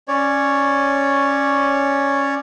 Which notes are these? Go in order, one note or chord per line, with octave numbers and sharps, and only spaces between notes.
C#4 C#5 D5